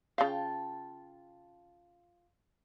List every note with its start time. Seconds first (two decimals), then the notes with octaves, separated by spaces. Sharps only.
0.18 C#3 F4 F5 G5 A5